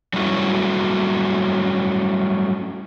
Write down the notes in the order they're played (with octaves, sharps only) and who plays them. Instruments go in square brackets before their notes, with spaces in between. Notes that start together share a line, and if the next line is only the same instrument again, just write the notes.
[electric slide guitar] F#3 G3 A3 C#4 E4 F#4